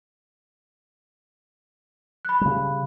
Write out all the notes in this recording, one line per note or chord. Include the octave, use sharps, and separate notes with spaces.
B5 F#6
C#3 G3